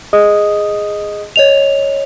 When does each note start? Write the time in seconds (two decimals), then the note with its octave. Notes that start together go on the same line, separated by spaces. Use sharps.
0.13 G#4 D#5 D#6
1.36 C#5 D#5 F7